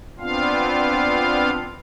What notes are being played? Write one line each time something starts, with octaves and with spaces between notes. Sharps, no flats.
B3 C4 D4 F4 F5